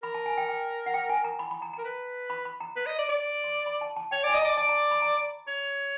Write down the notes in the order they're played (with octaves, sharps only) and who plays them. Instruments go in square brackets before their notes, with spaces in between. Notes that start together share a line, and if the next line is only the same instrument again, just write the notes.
[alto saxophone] A#4 [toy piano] B5
[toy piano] A5
G#5
G5
G5
F#5
G5
G#5
A#5
B5
B5
A#5
[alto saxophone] A#4 [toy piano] A#5
[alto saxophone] B4
[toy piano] B5
B5
A#5
[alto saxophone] B4
D#5
D5
D5
[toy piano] C6
B5
A5
A5
[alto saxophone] C#5 [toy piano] G5
[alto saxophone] D5
[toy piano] G#5
[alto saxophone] D#5
[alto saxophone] D5 [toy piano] A#5
[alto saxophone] D5 [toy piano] A5
[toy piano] A#5
B5
A#5
[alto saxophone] C#5